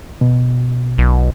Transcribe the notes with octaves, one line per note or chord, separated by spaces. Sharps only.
B2
B1